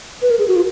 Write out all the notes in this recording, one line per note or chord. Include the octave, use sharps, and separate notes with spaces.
B4
A#4
G#4
F#4
F4